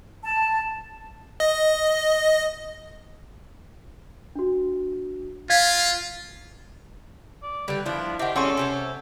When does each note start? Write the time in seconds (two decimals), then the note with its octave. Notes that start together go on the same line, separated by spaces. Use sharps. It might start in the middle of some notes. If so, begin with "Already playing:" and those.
0.24 A5
1.40 D#5
4.36 D4 F#4
5.50 F4 F5 G#6 B6
7.43 D5
7.68 D3 G3 B4 G5
7.86 F3 B3 D4 E4
8.19 D#3 C4 G4 E5 F#5
8.36 G3 C4 C#4 G#4 A4 F#5 C6 C#6
8.57 C3 C5 C#5